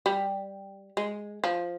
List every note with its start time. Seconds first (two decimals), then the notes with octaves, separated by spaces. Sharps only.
0.06 G3
0.97 G#3
1.44 F3